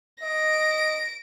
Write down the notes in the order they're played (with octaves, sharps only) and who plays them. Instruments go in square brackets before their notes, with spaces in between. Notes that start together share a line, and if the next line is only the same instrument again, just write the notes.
[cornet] D#5 [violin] A#6 D7